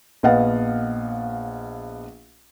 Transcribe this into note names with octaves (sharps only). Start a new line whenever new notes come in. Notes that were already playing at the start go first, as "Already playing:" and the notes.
A#1 B3 D#5 F5 F#5 A6